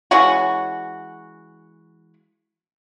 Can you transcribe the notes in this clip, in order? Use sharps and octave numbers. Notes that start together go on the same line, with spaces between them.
E3 G#3 C#4 F#4